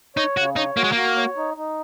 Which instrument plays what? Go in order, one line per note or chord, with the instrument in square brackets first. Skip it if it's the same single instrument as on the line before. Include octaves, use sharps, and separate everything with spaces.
[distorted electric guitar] D#4 [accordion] C#5
[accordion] C#3 [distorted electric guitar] F#4
[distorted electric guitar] D#4 [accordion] C#5
[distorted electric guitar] A#3 [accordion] F#4
[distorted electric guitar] G#3
[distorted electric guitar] A#3 [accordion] F#4
[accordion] C#5
D#4
D#4